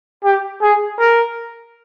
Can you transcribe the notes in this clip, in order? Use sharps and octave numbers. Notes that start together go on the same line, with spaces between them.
G4
G#4
A#4